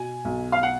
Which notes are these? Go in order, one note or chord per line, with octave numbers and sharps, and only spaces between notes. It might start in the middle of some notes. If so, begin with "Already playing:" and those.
Already playing: B2 G#5
B1
F5
F#5